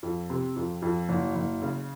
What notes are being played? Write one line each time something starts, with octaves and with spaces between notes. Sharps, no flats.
F2
C3
F2
F2
F#1
F#1
C#3